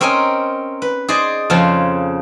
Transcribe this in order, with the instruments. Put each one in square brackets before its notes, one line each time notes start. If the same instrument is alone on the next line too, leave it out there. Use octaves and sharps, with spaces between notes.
[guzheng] C4 C#4 A#4 D#5 G#5
B4
G#4 C5 D5 D#5
F2 C#3 F3 C5